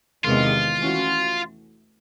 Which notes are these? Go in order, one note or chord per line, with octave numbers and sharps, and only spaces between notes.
E2 C3 D#3 G#3 F4
E3 A3 C#4 F#4